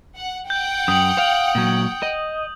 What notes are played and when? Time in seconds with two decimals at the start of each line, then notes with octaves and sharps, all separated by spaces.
0.17 F#5
0.50 F#5 G5 G6
0.88 F#2 D#6 F#7
1.18 F5
1.55 A#2 F#3
2.03 D#5